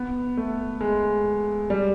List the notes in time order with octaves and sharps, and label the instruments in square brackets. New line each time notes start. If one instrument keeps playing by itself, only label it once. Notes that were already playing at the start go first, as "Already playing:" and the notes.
Already playing: [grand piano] B3
A3
G#3
G3